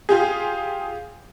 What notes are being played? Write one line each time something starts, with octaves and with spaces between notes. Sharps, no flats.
F4 G4 G#4